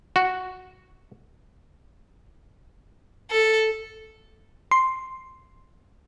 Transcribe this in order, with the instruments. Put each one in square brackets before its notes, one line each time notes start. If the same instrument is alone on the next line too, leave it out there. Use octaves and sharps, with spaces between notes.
[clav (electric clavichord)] F#4
[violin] A4
[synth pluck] C6